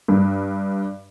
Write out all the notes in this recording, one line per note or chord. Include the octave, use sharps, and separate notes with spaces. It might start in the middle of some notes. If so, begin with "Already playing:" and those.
G2